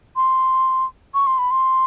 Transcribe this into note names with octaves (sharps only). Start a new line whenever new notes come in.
C6
C#6
C6
B5
C6